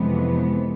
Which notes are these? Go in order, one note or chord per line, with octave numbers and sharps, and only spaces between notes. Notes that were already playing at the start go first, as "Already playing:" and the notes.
Already playing: F2 C3 E3 G#3 B3